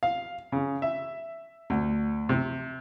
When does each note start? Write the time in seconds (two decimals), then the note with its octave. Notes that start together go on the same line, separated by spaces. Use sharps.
0.03 F5
0.52 C#3
0.82 E5
1.70 D2
2.29 C3